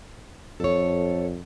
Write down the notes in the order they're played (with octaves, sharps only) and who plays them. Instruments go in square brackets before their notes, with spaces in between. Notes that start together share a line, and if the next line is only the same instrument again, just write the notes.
[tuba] F2 [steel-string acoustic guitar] A4 C#5